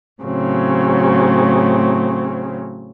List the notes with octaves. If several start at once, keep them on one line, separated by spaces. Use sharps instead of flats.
A2 C#3 F#3 C4